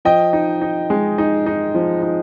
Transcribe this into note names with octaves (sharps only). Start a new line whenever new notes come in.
F3 D#5 G5
D#4
D#4
G#3
D#4
D#4
F3
D#4